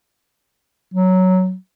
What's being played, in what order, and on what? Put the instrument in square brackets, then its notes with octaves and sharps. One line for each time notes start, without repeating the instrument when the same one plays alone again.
[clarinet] F#3